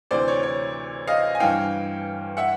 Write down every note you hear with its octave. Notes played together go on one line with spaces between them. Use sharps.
D2 C3 E3 C5 D5
C#5
C#5
D#5 F5
G#5
G2 E3 F5 G5
E5 F#5